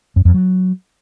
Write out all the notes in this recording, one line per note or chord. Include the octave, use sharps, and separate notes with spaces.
F#2
F2
F#3